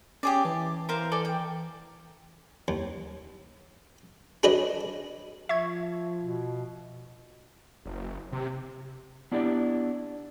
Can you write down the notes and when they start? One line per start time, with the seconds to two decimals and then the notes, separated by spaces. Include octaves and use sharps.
0.23 C#4 G4 G#4 D5
0.45 E3 A5
0.89 A#4 C5 F5
1.12 A4 D5 G#5
1.25 G5
2.68 D#2
4.43 D4 F#4 G#4 B4 C#5 D#5
5.49 F3 E5 C#6 G#6
6.22 B2
7.85 F#1
8.33 C3
9.32 B3 D4 E4 G4 C5 D5